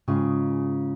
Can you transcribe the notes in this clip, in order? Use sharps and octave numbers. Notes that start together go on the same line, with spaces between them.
G#2 C#3 F4 D#5 G5